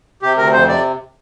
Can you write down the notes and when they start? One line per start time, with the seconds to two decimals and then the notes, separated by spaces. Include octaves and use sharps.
0.22 C3 G4
0.37 D2 A#4
0.53 F2 C5
0.68 C3 D5